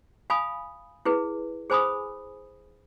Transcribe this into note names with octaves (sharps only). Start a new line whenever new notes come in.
F5 G#5 B5 D#6
E4 G#4 B4
G#4 C5 G#5 B5 D#6